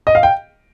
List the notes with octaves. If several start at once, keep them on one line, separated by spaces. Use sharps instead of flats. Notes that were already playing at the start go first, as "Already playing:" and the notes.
D#5
F5
G5